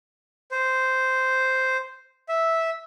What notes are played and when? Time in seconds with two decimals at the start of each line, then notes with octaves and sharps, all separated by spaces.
0.52 C5
2.29 E5